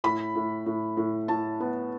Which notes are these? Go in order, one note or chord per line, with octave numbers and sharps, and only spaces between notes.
A2 B5
A2
A2
A2
A2 A5
B3